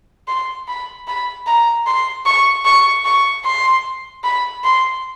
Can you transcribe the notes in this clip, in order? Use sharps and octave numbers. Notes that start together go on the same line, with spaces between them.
C6
B5
B5
A#5
C6
C#6
C#6
C#6
C6
B5
C6